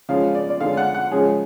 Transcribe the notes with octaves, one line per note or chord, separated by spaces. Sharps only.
C#3 F3 G#3 C#4 F5
D5
D5
D3 G#3 C#4 F5
F#5
F#5
C#3 F3 G#3 C#4 G#4